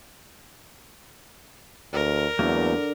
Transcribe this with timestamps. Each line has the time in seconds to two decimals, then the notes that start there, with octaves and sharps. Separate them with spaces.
1.93 D2 A#4 D5
2.39 E2 D3 F#3 A3 A#3 D6